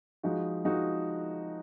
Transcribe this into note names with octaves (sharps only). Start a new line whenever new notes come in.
F3 G#3 D#4 F#4
F3 G#3 D#4 F#4